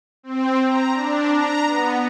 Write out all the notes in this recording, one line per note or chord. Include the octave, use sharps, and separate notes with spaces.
C4
A#5
D4
A#5
B3